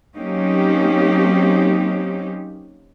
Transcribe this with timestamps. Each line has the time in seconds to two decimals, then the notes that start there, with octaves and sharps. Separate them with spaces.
0.17 F#3 A#3 C4 C#4 D#4 G4